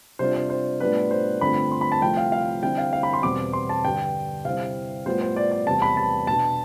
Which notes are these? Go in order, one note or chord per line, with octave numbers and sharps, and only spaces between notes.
C3 G3 D4 F4 C5
C5
C5
A2 G3 B3 D4 F4 B4
C5
G2 D3 A3 C4 F4 B5
C6
B5
A5
C2 C3 F3 A3 G5
F5
F5
D3 G3 C4 E4 G5
F5
F5
B5
C6
E2 B2 G3 C4 D6
C6
A5
G2 D3 G3 G5
C3 G3 C4 E4 F5
A2 G3 B3 F4 C5
C5
D5
D5
E2 C3 G3 B3 A5
B5
A5
B2 B3 D4 A5